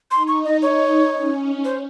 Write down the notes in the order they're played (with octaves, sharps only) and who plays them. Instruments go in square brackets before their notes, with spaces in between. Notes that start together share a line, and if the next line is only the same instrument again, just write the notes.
[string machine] D#4 [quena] C6
[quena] C#6
D#5
C#5
[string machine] C#4
[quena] C5